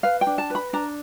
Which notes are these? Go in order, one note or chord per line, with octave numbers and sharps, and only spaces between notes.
B4 F5
G5
D4
A5
B4 B5
D4 A#5